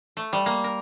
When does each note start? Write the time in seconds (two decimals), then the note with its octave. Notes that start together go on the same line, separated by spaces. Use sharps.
0.17 A3
0.33 G3
0.46 A#3
0.64 A#4